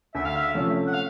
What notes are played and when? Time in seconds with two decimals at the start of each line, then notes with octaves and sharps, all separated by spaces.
0.15 D2 E5
0.25 F5
0.36 E5
0.54 C3 F3 A3 C#4
0.87 F#5
0.93 F5